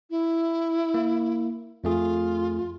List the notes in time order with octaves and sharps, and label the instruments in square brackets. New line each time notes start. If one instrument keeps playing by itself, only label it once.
[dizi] E4
[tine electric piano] A#3
[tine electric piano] F2 A3 G#4 [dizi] F4